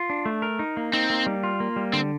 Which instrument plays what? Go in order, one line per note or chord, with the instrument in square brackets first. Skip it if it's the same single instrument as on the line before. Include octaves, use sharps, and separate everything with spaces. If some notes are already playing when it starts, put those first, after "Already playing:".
Already playing: [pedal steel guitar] F4
D4
A3
A#4
D#4
A#3
[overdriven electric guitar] C4 [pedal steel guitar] D#4
[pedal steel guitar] A#3
G3
F4
A#3
G3
[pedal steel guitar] D3 [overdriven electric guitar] C4